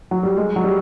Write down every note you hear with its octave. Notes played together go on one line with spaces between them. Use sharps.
F#3
G3
G#3
F#3
G3